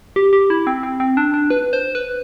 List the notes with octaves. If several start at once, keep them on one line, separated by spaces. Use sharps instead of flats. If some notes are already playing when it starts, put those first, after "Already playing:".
G4
G4
E4
C4
C4
C4
D4
D4
B4
C5
B4